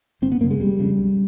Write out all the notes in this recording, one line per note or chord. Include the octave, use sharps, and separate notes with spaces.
G1 C4
B3
F#2 C#3 A#3
G#3
F1 G3
F2 C#3
B1